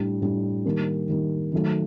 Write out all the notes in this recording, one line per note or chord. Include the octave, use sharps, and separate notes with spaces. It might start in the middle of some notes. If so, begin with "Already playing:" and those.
Already playing: A2 G3 D4
A2 G3 D4
D#3 G3 A#3
D#3 G3 A#3
D#3 F#3 A3